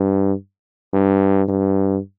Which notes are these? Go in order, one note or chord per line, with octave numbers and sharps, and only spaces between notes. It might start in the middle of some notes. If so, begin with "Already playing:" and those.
Already playing: G2
G2
G2